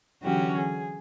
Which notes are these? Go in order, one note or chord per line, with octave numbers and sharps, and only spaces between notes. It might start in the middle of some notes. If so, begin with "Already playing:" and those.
D3 E3 F#3 C#4 F#4 G4
G#4